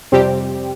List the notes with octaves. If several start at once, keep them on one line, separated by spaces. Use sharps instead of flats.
F2 C3 G3 C4 G4